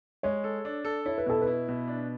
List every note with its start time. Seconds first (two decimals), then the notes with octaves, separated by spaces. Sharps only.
0.23 G#3 C#5
0.44 A4
0.65 D4
0.85 A4
1.05 E4 C#5
1.18 B4
1.26 B2 A4
1.42 B4
1.47 E4
1.68 B2
1.88 D4